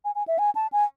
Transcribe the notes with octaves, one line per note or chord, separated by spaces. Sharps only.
G#5
G#5
E5
G#5
A5
G#5